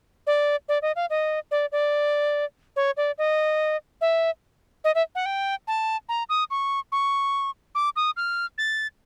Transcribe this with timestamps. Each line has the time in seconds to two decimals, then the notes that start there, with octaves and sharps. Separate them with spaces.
0.27 D5
0.69 D5
0.82 D#5
0.96 F5
1.10 D#5
1.51 D5
1.72 D5
2.76 C#5
2.97 D5
3.18 D#5
4.01 E5
4.84 D#5
4.95 E5
5.15 F#5
5.26 G5
5.68 A5
6.09 A#5
6.29 D#6
6.51 C#6
6.92 C#6
7.75 D6
7.96 D#6
8.17 F6
8.58 A6